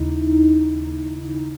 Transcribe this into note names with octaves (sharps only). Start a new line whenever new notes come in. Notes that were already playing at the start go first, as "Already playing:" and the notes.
Already playing: D#2 C#3 D#4 E4